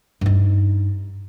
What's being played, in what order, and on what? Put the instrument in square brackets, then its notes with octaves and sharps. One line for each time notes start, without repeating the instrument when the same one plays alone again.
[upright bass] G2 D#4